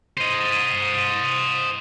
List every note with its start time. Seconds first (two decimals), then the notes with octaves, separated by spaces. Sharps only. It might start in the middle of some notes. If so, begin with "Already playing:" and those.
0.17 C5 D#5